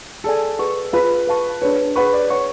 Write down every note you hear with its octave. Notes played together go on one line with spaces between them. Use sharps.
G#4 A4 D5 G#5
G#4 B4 F#5 C#6
F4 G#4 B4 C#5 F5 B5
B4 F5 A5 C#6
D4 G#4 B4 C#5
G#4 B4 C#5 F#5 C#6
D5
B4 C#5 F#5 C#6